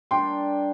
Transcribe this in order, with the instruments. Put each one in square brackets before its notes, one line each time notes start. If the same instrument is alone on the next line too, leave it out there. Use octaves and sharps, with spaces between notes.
[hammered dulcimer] G3 D4 A#4 D5 [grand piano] G5 C6